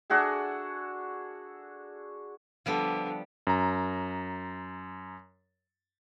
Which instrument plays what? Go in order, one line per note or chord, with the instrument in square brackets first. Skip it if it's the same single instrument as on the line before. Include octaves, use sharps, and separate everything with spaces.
[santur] D4 F#4 G#4 A4
[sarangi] D3 [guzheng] F3 G3 B3
[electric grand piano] F#2 A#5